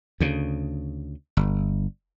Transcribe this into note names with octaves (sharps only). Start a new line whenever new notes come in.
D2 C#3
G1